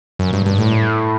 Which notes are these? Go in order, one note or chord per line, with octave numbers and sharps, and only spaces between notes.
F#2
G2
G2
A2